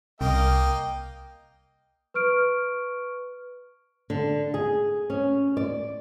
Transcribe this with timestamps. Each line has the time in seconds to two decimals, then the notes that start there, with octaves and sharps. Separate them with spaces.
0.21 C2 A#3 D#5 G5
2.14 B4 C#6 F6 D7
4.10 D3
4.54 G#4
5.10 C#4
5.57 D5